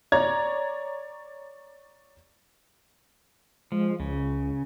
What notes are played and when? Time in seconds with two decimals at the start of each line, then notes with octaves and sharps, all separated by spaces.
0.12 C#5 D5 A#5 G#6
3.72 F3 G#3
4.00 C#2 C#3